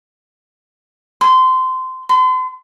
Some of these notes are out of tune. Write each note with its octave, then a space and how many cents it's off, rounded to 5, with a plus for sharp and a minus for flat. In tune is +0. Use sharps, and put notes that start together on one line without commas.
C6 -20
C6 -40